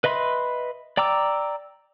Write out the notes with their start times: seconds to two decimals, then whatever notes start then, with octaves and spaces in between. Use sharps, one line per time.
0.04 B4 D#5 E5 B5 C6
0.97 D5 G5 A#5 D6 E6